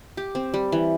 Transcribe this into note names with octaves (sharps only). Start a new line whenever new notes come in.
G4
C4
G3
E3